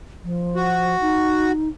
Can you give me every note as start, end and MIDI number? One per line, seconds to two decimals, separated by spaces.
0.24 0.96 53
0.56 1.52 66
1.01 1.69 63